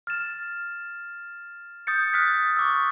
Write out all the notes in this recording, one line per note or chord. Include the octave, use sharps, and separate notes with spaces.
F6 A6 E7
D#6 G6 A6 C#7
D#6 F6 F#6 A6 B6
C#6 D6 E6